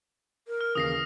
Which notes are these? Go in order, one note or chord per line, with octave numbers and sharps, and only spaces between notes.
A#4
F6
D#2 C#3 E3 D#6 A#6 C7